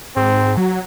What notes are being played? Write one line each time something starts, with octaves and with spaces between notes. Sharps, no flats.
G#2 C4
F#3